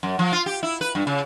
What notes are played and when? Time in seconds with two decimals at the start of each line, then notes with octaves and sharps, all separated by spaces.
0.03 F#2
0.19 F3
0.32 F4
0.46 G4
0.63 E4
0.81 B4
0.95 G2
1.07 C#3